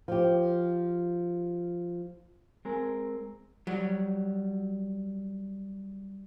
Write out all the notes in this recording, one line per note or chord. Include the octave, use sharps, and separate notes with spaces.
F3 G4
G#3 C4 A#4
F#3 G3